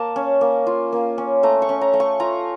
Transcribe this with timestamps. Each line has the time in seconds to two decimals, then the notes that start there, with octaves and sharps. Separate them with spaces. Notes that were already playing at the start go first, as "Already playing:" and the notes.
Already playing: A#3 A5
0.16 C#4
0.41 A#3
0.67 F4
0.92 A#3
1.18 C#4
1.43 A3 A#5
1.62 C#6
1.69 C#4
1.81 A#5
1.93 A3
2.00 C#6
2.20 F4 A#5